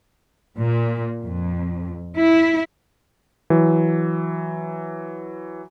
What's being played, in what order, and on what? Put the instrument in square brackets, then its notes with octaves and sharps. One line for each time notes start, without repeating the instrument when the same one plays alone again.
[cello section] A#2
F2
E4
[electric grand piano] E3 F#3